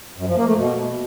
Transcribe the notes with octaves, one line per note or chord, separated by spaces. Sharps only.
F#2
F3
A#3
A3
B2